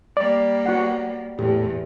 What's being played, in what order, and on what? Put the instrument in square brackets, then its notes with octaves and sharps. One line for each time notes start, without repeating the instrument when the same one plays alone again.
[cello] G3 A#3 [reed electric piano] D5
[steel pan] F#4 F#5
[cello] E2 E3 [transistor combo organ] A2 [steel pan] G4